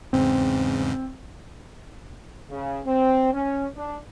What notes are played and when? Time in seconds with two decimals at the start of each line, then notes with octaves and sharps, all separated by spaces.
0.13 E2 G#2 C#3 C4
2.50 C#3
2.85 C4
3.33 C#4
3.76 D4